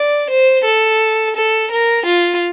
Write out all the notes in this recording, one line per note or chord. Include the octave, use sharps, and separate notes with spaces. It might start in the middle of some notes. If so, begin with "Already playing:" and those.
Already playing: D5
C5
A4
A4
A#4
F4